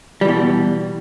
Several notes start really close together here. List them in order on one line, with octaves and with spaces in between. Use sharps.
G3 E3 B2